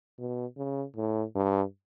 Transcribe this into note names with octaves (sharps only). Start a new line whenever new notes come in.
B2
C#3
A2
G2